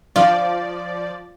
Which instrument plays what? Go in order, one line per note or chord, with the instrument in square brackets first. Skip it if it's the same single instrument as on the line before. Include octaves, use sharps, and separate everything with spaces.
[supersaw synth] F3 D5 [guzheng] F4